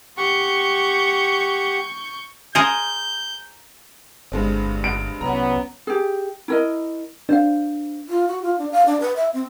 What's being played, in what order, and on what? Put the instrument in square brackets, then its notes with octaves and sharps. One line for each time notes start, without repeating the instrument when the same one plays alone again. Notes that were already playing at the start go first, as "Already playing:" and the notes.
[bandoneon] G4 F#5 [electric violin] C#6 G6
[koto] G#4 A#4 C5 [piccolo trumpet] G6
[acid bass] G1 [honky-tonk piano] G2 G#3 C4
[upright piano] D7
[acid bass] C2 [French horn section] F#3 B3 [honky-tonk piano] C#4 A#5
[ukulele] G4 G#4
E4 A#4 D#5
[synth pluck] D4 [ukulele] C5 F5
[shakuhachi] F4
F#4
F4
D4
F5
D4
B4
E5
C4